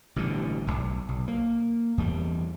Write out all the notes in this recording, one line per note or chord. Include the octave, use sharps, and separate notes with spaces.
A1 B2 D3 G3
D1 B1
B1
A#3
E2 G3